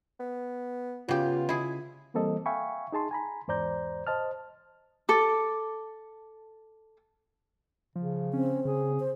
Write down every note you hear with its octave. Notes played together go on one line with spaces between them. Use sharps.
B3
C#3 B3 F4 G4
E4 G#4
E3 G3 A#3 C4 A4 D#5
E5 F5 G5 G#5 B5 C#6
D#4 G#4 A5 C6
G#5 A#5 B5
E2 G#2 C5 D5 A#5 G6
C5 D#5 A5 F6
A4 D6
C#3 F3
C4 C#4
C#3 G#4
C5